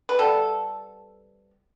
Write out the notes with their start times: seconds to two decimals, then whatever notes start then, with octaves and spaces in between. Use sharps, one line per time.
0.09 B4
0.18 C3 G3 B3 A4